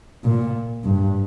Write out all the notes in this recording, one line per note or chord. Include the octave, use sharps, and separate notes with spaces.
A#2
G2